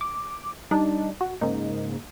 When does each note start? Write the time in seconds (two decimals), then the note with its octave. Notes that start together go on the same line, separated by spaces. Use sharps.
0.01 D6
0.71 G3 D4 D#4
1.21 F#4
1.41 G#2 C#3 A#3 D#4